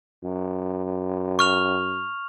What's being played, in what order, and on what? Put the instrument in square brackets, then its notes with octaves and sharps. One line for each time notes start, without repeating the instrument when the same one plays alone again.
[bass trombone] F#2
[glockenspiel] C#6 F6 F7